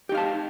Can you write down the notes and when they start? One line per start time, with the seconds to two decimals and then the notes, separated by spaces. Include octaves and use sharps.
0.09 G4
0.12 D#4
0.15 F5
0.17 A5